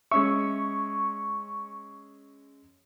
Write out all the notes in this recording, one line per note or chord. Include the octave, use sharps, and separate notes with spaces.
G#3 C#4 E5 C#6